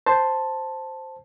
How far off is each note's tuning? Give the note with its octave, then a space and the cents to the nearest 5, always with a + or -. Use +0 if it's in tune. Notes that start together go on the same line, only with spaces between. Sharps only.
C5 +0 A5 +0